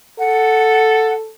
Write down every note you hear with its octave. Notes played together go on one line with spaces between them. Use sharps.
A4 F#5